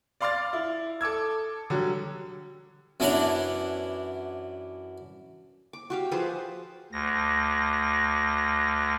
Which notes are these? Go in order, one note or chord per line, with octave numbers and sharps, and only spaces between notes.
D5 F5 C6 D6 F6 A6
E4
A4 D6 E6 G#6
D3 F#3 G3
F#2 E3 D4 C#5 F#5 A#5
D6
F#4 G4 F5
F3 G#4 B4 C5
D2 A#6